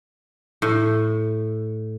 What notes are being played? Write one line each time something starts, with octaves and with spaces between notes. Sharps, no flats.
A2